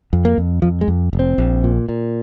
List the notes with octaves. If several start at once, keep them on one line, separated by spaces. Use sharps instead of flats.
F2
A#3
F2
F2 F3
G#3
F2
F1
C4
A#1
A#2
A#2